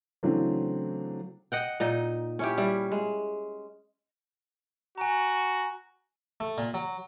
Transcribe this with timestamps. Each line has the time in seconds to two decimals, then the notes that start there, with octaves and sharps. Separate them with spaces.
0.23 C#3 E3 F#3 A3 C4 D4
1.52 D#5 F#5 G5
1.80 A#2 D#4 D#5
2.39 C#4 E4 G4
2.58 G3 E4
2.92 G#3
4.98 F#4 G#5 A#5
6.40 A3
6.58 A#2
6.74 F#3